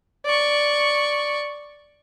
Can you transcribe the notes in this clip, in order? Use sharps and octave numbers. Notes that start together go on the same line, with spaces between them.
D5 C#6